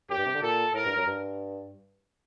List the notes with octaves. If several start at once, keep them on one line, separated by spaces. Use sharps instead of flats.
F#2 G4
G2
C3
D3
A#2 A4
A2 A#4
G2
F#2
G2